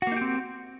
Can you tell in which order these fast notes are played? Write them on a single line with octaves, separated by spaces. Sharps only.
F#4 A#3 D#4 G4 C4